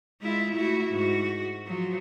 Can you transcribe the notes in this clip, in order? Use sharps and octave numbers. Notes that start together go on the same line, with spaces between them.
G#3 E4 F4
A3 E4 F#4
G#2 F#4
F3 F#3